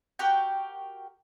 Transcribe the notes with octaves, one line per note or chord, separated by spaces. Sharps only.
F#4 G4 A#4 G5